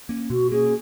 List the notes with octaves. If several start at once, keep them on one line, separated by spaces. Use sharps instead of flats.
A#3 C#4
B2 F#4
A#3 C#4 G#4